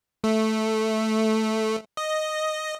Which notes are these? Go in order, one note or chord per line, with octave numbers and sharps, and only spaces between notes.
A3
D#5